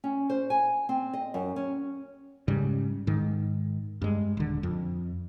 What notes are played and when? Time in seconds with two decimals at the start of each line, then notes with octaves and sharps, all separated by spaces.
0.04 C#4
0.29 C5
0.50 G#5
0.89 C4
1.13 D#5
1.34 F#2
1.56 C#4
2.48 G#2 C#3 G3
3.07 G#2 D#3
4.02 G2 G#3
4.37 D#1 D3
4.63 F2